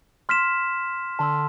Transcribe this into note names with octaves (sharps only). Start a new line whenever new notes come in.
C6 F6 B6 E7
D3 A5 C6 E6